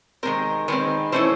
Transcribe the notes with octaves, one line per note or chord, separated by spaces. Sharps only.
D#3 G#3 C4 A#4
D#3 G#3 C4 B4
E3 A3 C#4 E4 C5